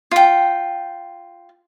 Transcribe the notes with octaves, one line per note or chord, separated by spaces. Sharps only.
F4 G5